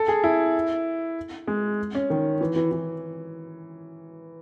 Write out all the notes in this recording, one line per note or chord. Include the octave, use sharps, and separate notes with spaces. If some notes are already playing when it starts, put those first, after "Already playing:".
Already playing: A4
G#4
E4
G#3
C#4
D#3
E3
E3
E3